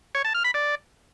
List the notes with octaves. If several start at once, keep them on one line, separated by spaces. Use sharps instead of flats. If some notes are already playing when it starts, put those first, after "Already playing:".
C#5
A5
F6
B5
D5